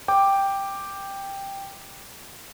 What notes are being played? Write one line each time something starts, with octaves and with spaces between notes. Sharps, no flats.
G5 D6